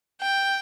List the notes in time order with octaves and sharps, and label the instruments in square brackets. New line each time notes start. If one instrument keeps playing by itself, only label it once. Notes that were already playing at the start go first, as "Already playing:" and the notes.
[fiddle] G5